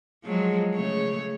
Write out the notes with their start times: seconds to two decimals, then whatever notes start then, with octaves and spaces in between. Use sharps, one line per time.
0.24 F3 F#3 G#3
0.75 C#3 A3 C#5